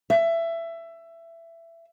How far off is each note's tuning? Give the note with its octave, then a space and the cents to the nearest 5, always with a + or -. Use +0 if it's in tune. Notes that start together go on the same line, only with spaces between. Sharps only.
E5 +20